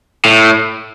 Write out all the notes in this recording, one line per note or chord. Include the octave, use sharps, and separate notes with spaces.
A2